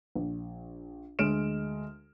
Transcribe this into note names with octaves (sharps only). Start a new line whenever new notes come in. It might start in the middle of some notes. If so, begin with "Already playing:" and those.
A#1
D2 G#3 F6 D7 E7